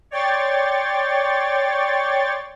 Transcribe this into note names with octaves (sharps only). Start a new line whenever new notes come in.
C#5 D5 G5 C6 C#6 A6